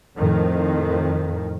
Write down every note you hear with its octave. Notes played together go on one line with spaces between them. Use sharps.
F2 A2 D#3